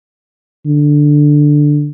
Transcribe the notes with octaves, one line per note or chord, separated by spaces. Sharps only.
D3